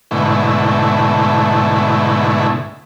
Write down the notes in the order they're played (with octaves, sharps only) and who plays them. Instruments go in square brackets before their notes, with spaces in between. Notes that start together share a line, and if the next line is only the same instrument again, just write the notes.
[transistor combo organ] G#2 B2 D3 A3 E4